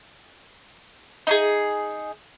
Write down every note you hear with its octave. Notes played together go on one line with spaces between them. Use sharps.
D#4 F4 G#4